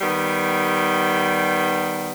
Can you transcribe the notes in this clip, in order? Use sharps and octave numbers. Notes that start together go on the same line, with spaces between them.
D#3 G3 B3